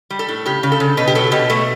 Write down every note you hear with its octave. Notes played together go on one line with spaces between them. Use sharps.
G3
A4
A2
C#3 G4
C#3
A4
C#3
B2 B4
G4
F#3 A4
B2 G4
B2 A3